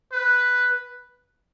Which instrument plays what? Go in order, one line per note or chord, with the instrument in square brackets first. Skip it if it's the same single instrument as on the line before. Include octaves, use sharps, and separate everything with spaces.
[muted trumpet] B4